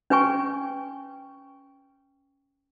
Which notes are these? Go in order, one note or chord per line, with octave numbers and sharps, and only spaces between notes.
C#4 B4 G5 G#5 C#6